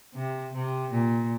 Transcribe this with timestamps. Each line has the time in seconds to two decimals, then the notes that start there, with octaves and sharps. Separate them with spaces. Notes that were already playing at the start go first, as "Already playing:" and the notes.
0.14 C3
0.53 C3
0.92 A#2